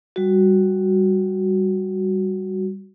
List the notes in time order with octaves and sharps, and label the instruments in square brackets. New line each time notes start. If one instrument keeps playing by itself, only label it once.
[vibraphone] G3 F#4